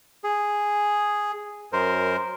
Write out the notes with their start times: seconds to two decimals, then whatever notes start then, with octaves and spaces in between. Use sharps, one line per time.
0.24 G#4
1.73 F#2 A#4 C5